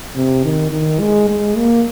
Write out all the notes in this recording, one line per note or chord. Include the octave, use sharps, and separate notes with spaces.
C3
D#3
D#3
G#3
G#3
A#3